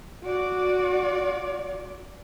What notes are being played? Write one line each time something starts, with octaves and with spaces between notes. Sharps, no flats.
F#4 D5